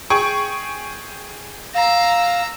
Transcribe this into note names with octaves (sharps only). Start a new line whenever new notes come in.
G#4 G5 C#6
F5 A#5 E6